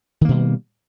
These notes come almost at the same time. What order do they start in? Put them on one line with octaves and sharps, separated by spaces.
D#3 A#3 B2 G3